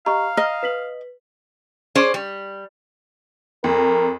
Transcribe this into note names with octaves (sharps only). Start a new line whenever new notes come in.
G4 D#5 F5 A#5 C#6
D#5 A#5 F6
B4 B6 F#7
C#4 G#4 C5 D5
G3
F2 A#4